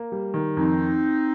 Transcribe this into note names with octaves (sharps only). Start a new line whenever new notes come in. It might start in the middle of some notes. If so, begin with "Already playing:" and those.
Already playing: A#3
G3
D#3
F2 C4 D#4